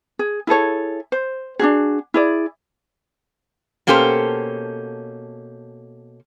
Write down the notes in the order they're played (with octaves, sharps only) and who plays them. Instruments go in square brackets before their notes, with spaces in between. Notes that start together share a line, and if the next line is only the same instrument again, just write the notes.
[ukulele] G#4
E4 G#4 A4 C#5
C5
D4 D#4 F#4 G#4
E4 G#4 D5
[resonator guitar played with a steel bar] B2 A#3 C#4 G4 A4 C5